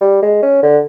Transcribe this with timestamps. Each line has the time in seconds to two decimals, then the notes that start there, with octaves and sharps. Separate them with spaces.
0.01 G3
0.22 G#3
0.43 C#4
0.63 D3